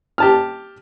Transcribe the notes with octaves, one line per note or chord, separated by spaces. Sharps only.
G4 A5 F6